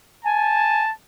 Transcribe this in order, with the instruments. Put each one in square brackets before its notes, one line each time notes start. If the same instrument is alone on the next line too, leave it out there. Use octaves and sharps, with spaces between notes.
[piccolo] G#5 [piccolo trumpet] A5